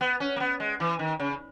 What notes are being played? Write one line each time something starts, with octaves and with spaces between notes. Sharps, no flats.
B3
C#4
A#3
B3
G#3
E3
D#3
C#3